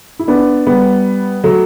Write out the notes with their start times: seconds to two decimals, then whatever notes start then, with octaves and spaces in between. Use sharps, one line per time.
0.19 E4
0.28 B3 D4
0.67 G3 B3
1.44 F#3 A3